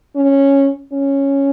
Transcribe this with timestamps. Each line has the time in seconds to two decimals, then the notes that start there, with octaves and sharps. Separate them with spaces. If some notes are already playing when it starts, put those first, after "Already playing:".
0.16 C#4
0.93 C#4